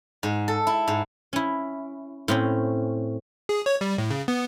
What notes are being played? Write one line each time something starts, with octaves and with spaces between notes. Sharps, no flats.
G#2
A4
E4
G#2
C#4 E4
A2 C4 C#4
G#4
C#5
G3
A2
C#3
B3